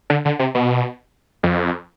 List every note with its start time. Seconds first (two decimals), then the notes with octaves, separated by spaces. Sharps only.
0.10 D3
0.25 D3
0.39 C3
0.55 B2
1.43 F2